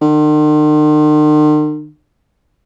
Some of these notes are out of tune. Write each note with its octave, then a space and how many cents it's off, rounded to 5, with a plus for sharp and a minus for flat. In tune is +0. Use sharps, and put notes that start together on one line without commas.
D#3 -45